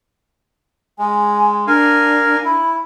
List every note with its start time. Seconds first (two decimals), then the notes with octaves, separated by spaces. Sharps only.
0.99 G#3 G#5
1.67 D4 A#4 F5 G#5
2.45 E4 B5